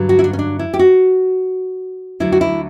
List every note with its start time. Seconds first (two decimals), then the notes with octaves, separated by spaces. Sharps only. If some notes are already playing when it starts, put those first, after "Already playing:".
Already playing: G2 D3 F#3
0.09 F#4
0.19 E4
0.24 D4
0.33 C#4
0.39 D4
0.59 E4
0.74 G4
0.79 F#4
2.20 D2 D3 F#3 E4
2.32 F#4
2.41 E4